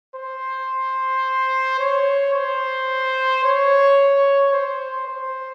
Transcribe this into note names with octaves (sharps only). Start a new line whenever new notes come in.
C5
C#5
C5
C#5
C5
C5